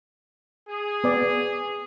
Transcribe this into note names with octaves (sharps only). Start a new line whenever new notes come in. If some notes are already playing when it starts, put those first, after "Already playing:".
G#4
B3 D5